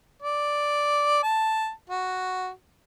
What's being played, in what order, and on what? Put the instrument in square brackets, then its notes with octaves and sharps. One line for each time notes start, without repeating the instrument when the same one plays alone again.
[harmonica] D5
A5
F#4